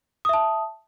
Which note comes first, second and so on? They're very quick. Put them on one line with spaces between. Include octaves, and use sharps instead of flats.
D#6 E5 A5